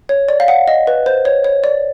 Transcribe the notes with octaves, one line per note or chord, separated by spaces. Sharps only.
C#5
D5
F5
F#5
D#5
B4
C5
C#5
C#5
D5